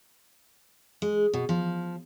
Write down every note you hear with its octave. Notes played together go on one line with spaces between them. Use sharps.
G#3
B2
F3